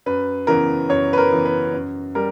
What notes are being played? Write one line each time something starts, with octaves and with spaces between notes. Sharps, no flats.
F#2 B4
C#3 E3 B3 A#4
F#2 C#5
B4
A#4
C#3 E3 B3
B4
F#2
G3 A#4